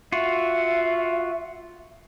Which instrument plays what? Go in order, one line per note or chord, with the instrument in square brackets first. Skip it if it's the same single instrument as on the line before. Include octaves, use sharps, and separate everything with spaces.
[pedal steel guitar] F4 F#4 [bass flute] E5